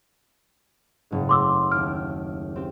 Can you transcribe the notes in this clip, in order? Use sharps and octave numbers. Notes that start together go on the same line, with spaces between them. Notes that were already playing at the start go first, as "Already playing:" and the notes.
F#1 G#2
A3 C6 D6 E6
D#2 F6 D7
C4 G4